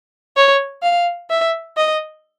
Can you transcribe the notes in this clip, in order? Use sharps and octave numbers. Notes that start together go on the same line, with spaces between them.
C#5
F5
E5
D#5